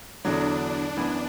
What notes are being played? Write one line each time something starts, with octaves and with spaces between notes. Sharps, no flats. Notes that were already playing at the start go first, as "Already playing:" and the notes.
E2 D3 F#3 D4
F#2 E3 B3